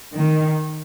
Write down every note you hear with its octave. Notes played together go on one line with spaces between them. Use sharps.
D#3